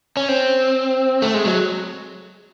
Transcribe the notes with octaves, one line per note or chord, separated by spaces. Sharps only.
C#4
C4
A3
G#3
F#3